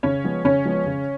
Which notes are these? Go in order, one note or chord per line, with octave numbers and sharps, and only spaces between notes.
C#3 C#4 C#5
F3 G#3 B3
C#3 C#4 C#5
F3 G#3 B3
C#3